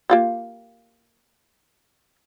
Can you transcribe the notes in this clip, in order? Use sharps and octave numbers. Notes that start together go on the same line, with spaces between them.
A#3 F4 G4